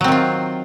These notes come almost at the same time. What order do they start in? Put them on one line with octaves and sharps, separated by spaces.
F#3 C4 D#3 F4